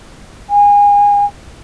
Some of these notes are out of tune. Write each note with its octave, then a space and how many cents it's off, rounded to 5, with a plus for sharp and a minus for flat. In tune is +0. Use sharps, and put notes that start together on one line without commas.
G#5 -30